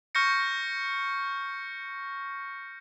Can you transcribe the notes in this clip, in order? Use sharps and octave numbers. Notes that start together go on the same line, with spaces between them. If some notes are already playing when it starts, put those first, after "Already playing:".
C#6 F6 G6 A#6 C#7